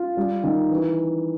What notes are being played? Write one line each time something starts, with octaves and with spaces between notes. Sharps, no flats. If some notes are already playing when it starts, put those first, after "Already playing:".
Already playing: F4
G3
D#3
E3